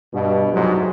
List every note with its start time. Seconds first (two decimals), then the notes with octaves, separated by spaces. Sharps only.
0.14 G2 B2
0.53 C2 F2 G#2 F#3